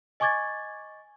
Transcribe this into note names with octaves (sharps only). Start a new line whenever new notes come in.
D#5 G#5 C#6 D6 G#6 A6